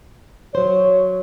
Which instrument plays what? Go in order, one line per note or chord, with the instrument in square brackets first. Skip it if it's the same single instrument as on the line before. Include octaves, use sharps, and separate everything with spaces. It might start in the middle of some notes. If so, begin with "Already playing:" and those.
[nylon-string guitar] F#3 C5 [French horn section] C#5